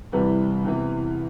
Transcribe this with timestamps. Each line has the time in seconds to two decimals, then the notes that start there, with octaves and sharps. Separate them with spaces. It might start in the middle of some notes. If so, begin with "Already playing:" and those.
0.12 C2 C3 E3 G3 B4
0.64 E2 C3 E3